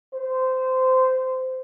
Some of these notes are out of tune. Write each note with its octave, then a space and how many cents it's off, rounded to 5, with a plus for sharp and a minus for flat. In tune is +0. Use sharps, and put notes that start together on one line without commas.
C5 -15